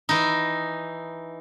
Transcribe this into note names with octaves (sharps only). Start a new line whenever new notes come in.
E3 D#4